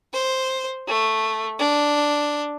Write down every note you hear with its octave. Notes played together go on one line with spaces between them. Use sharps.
C5
A3
D4